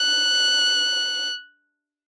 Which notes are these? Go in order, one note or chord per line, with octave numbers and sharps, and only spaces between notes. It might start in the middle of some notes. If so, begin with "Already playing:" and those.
Already playing: F#6